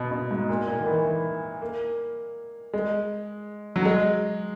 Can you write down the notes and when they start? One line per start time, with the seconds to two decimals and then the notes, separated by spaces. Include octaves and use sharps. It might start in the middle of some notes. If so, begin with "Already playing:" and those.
Already playing: B2
0.11 B2
0.31 G#2
0.49 A#2
0.68 A#2
0.79 D#3
0.86 E3
1.05 E3
1.62 A#3
2.73 G#3
3.76 F#3
3.85 G#3